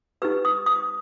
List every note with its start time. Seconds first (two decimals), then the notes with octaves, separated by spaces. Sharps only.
0.22 D#4 G4 B4 E6
0.45 D#6
0.66 D#6